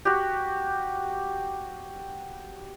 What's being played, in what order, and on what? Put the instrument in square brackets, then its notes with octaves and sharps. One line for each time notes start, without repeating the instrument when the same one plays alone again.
[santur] F#4 G4